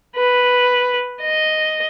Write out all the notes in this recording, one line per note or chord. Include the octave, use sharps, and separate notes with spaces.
B4
D#5